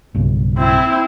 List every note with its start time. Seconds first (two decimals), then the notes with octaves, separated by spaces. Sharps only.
0.14 B1 G2 C#3
0.58 C4 E4